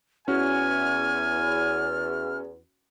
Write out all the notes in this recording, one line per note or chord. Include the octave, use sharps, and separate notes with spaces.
E2 C#4 F#4 G#5 F6